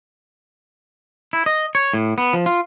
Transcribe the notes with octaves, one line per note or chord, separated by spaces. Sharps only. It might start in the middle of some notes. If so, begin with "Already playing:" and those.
E4
D#5
C#5
A2
B3
F3
F4